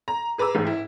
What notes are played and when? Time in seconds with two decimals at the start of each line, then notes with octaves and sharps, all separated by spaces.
0.08 A#5
0.38 G#4 B4 A#5 D6 E6
0.55 A1 G#2
0.67 E4